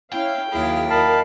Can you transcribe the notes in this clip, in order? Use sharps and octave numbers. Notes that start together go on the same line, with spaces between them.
C#4 E4 F5 G5
D#2 F#3 E4 G#4 F5
A#4 D#5 F5 A5 B5